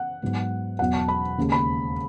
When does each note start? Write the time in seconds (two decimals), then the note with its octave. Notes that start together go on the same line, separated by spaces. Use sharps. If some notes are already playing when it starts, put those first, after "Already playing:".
Already playing: F#5
0.22 G#2 F#3 B3
0.79 E1 E2 B2 F#3 F#5
0.94 A5
1.08 B5
1.38 D#2 C#3 G#3
1.52 B5